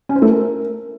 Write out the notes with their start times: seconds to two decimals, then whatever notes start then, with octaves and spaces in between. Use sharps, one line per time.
0.09 C#4
0.16 C5
0.22 A3
0.28 A#4